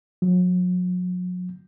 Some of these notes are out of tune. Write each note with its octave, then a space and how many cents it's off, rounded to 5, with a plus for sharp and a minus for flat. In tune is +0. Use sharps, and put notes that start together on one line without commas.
F#3 -40